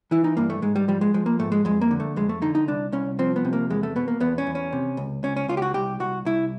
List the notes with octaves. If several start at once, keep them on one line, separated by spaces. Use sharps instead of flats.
E3 E4
D#4
G2 A#3
A3
G#2 G#3
G3
F3 G3
G#3
F3 G#3
A#3
G#2 A3
G#3
F2 G#3
A#3
D3
A3
F2 G#3
A3
D3 D#4
D#4
C2 D4
C2 C#4
F3 C4
B3
C3
A#3
E2 G#3
A3
B2 B3
A#3
E2 B3
C#4
E2
C#4
C3
C#2
C#2 C#4
C#4
C#2 F4
G4
F#4
C2 G4
C2 F#4
C2 E4